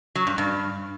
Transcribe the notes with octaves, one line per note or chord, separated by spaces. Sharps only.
F#3
G2
G2